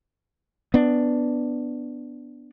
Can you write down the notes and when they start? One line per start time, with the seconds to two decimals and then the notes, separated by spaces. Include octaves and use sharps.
0.74 B3 D4